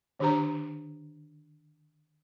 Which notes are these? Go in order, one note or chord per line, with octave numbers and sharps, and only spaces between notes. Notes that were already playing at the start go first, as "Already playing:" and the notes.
D3 D#3 D4 G4 C5 A#5